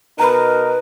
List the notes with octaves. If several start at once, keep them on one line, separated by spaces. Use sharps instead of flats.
B2 D#4 A#4 B4 A#5 B5